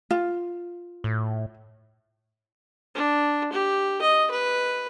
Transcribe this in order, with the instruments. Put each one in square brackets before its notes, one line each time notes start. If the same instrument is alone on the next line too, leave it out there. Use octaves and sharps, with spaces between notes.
[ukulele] F4
[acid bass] A2
[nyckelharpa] D4
G4
D#5
B4